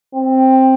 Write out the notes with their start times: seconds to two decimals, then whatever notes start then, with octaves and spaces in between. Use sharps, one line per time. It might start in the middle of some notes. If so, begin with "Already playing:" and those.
0.14 C4